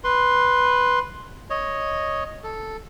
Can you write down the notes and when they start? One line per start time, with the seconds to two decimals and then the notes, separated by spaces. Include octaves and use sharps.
0.04 B4 C6
1.50 C#5 D#5
2.43 A4